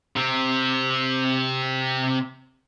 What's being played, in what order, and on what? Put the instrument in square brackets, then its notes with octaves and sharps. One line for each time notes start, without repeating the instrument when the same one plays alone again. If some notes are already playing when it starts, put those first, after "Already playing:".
[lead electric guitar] C3 C4